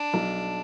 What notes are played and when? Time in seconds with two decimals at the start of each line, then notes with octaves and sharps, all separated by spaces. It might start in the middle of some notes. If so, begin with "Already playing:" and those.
Already playing: D4
0.13 B1